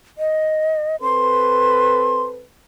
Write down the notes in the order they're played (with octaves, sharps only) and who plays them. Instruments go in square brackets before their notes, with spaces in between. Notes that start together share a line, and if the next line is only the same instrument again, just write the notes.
[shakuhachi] D#5
[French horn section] C4 A4 B4 [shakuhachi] C6